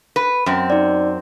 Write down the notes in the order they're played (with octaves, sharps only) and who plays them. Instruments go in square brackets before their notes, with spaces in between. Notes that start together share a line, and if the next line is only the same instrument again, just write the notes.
[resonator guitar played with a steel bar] B4
F#2 C4
[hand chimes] D#4 D5